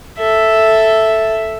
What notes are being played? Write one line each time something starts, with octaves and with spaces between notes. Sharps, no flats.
A4 E5